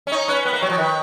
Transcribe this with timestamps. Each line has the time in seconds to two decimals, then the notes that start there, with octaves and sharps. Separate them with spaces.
0.07 C#4
0.12 D#4 C#5
0.28 C#4 B4
0.45 B3 B4
0.53 A#3
0.62 F#3 C#5
0.70 F3
0.78 D#3 B4